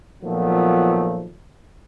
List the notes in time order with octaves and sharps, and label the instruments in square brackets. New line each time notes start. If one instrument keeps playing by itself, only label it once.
[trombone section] A#2 D#3 F3 F#3 A3 B3